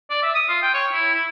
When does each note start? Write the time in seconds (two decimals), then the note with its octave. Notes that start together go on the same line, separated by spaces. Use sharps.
0.10 D5
0.22 E5
0.35 D#6
0.48 F4
0.62 G5
0.74 C#5
0.92 E4
1.14 E4